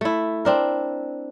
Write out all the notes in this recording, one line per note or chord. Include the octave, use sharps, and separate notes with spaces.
A3 E4
C4 D4 A#4